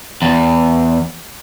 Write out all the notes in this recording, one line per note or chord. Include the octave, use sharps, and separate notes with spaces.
E2